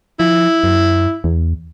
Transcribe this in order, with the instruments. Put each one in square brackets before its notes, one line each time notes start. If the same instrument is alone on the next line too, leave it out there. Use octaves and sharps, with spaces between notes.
[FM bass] F3 [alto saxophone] E4
[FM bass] F#2
E2